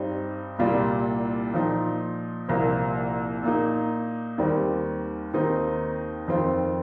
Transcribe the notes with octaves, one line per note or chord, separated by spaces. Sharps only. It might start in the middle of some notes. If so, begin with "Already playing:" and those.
Already playing: G2 G3 C4 D#4
C2 A#2 G3 A#3 F4
A#2 F3 D#4
C2 A#2 F3 A#3
A#2 A#3 D#4
D#2 D#3 G3 C4
D#2 D#3 C4 D#4
F2 D#3 C4 F4